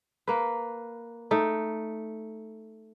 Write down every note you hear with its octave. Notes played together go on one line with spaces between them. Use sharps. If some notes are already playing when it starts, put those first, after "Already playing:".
A#3 B4
A3 D#4